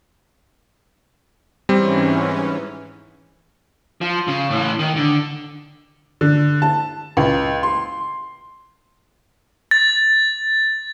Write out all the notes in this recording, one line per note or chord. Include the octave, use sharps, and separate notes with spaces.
G#2 E3 G3 C4 C#4
F3
C#3
A2 E3
D#3
D3
D3
A5
C#2
C6
A6